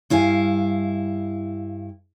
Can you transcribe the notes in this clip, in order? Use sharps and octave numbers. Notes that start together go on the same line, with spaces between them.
G2 E4 F5 G#5